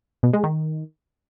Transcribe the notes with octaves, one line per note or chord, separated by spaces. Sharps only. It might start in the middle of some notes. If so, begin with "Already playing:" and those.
B2
G#3
D#3